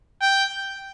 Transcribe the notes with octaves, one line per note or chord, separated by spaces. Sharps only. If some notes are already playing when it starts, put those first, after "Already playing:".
G5